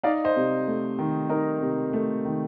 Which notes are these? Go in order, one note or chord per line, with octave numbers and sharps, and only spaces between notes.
D#4 D5 F5
C5 D#5
C3
A3
D#3
D#4 A#4
C3
A3
D#3